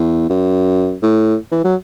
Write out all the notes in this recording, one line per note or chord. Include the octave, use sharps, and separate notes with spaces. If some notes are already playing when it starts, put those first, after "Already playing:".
Already playing: E2
F#2
A2
E3
F#3